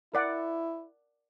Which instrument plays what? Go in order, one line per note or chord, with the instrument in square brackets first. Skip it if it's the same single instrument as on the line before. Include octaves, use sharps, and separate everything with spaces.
[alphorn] E4 [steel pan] A#4 D5 F#5